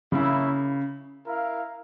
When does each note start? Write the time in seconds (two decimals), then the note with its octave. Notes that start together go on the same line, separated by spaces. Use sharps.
0.12 C#3 A#3 C#4 E4
1.25 E4 A#4 F5